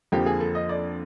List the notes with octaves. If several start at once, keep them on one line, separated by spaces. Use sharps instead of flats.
F2 D3 F3 A#3 G4
G#4
A4
D#5
D5